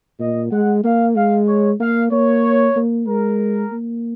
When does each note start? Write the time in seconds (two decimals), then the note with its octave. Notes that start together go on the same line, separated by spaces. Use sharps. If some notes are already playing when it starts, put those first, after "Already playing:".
0.19 A#2 D#5
0.52 G#3 F#5
0.84 A#3 F5
1.15 G#3 F5
1.48 C#5
1.80 A#3 F5
2.11 A#3 C#5
2.76 A#3
3.07 G#3 A#4
3.72 A#3